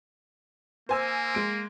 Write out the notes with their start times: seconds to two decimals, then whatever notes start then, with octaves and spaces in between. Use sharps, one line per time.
0.89 A#3 C5 G#5 E6
1.35 G#3 D7